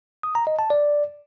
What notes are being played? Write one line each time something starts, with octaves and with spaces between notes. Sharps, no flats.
D#6
A#5
D#5
A5
D5